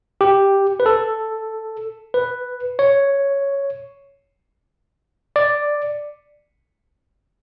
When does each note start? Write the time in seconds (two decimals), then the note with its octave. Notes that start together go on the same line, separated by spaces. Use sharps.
0.21 G4
0.80 B4
0.86 A4
2.14 B4
2.79 C#5
5.36 D5